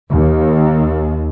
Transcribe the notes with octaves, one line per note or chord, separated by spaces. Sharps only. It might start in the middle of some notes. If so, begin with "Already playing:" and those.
D#2